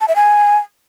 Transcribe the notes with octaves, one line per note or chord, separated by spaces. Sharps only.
A5
E5
G#5